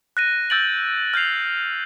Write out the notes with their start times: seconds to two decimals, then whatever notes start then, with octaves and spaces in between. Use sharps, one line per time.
0.17 F#6 A#6 D#7
0.50 E6 G6 A6 D7 F#7
1.14 F6 G6 A6 C7 F7